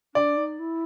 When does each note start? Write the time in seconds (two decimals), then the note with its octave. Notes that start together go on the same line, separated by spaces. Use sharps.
0.15 D4 D5
0.37 D#4
0.59 E4